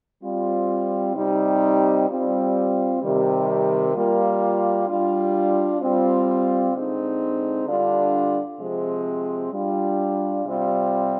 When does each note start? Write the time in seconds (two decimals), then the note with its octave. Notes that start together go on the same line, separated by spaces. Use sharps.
0.22 G3 C4 F4
1.15 C3 G3 C4 D#4
2.08 G3 C4 F4
3.01 C3 D#3 G3
3.94 G3 A#3 F4
4.87 G3 D4 F4
5.80 G3 C4 F4
6.73 D3 G#3 C4 D#4
7.66 D3 G3 D4 F4
8.59 C3 F3 G#3 C4
9.52 G3 D4 F4
10.45 C3 G3 C4 F4